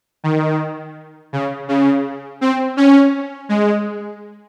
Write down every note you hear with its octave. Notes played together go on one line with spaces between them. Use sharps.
D#3
C#3
C#3
C4
C#4
G#3